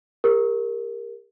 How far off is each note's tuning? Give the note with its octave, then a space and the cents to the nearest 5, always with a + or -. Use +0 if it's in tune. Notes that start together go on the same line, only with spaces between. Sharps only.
G4 +40 A#4 +0